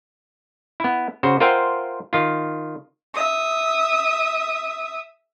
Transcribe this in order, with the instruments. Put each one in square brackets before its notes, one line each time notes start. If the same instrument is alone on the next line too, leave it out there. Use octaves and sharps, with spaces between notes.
[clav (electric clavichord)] B3 E4
C#3 F#4 C5
F4 A#4 C5 E5 F#5 G5
D#3 F4
[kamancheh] E5 D#6